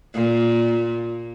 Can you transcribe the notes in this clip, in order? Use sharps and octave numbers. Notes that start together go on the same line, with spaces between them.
A#2